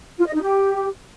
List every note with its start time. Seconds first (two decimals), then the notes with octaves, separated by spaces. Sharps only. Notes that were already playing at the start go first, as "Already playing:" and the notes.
0.19 F4
0.27 D#5
0.34 D#4
0.42 G4